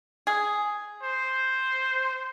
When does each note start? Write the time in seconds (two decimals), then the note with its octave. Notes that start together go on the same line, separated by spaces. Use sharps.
0.27 G#4
1.03 C5